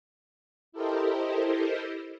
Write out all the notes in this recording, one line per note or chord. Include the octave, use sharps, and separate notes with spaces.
E4 G4 A4 A#4 C5 D#5